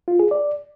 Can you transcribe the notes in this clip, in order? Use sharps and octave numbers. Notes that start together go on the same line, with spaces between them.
F4
G#4
D5